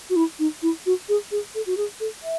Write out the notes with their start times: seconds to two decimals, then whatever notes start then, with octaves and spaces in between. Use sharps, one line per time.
0.10 F#4
0.16 E4
0.39 D#4
0.62 E4
0.86 F#4
1.09 G#4
1.31 G#4
1.55 A4
1.66 F#4
1.77 G#4
2.00 A4
2.23 E5